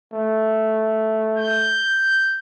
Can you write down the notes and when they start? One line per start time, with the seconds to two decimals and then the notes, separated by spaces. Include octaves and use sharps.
0.13 A3
1.38 G6